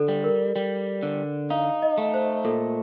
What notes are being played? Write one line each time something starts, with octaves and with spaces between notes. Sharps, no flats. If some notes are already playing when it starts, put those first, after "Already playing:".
Already playing: D3 A4
G3
A#4
G3
D3
D#4 F5
D#5
A3
C5
A#2 A4